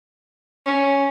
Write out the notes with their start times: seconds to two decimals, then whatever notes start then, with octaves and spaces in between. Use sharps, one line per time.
0.66 C#4